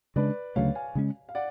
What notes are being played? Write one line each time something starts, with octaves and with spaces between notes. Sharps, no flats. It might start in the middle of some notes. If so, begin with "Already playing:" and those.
C#3 G#3 D4 B4 D5
D2 C#3 F#3 A3 C#5 F5
F5 G#5
C#3 G#3 C#4
F5
D5 F#5